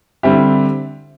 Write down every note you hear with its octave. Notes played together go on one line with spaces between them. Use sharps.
D3 G3 C4 E4 G4